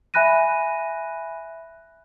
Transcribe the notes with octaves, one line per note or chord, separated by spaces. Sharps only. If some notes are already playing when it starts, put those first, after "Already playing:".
E5 G#5 B5 F#6 A#6 D#7